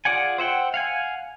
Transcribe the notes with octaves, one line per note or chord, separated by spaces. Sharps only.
F4 G#4 D5 F#5 G#5
C5 E5 F#5 G5
F5 F#5 G#5